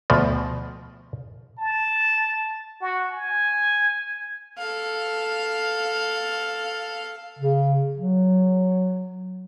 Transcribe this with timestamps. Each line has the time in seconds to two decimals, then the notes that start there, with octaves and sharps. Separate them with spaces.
0.10 D2 B2 F3
1.58 A5
2.81 F#4
3.11 G#5
4.58 A4 F5
7.39 C#3
7.98 F#3